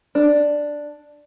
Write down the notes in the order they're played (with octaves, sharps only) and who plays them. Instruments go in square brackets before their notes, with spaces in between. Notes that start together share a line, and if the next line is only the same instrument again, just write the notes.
[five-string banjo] D4